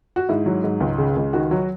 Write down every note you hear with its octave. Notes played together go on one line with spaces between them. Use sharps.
F#4
G#2 E4
F#3
G#2
C#2
C#3
C#2
D#3 F#4
F#3